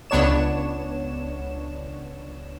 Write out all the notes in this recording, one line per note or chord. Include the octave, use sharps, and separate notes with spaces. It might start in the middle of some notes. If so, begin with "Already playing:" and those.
C#2 B3 D4 C#5 E7